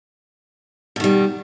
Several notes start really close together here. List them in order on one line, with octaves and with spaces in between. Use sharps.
B2 D#3 G3